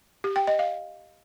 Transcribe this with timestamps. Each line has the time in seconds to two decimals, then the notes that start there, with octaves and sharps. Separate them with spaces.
0.24 G4
0.36 G5
0.47 D#5
0.59 F5